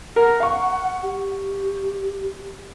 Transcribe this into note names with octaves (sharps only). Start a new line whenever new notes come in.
A#4 F#5
F5 C#6
G4